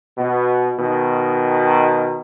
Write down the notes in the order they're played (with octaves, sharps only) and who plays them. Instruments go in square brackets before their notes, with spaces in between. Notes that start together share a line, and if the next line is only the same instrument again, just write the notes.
[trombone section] B2
B2 D#3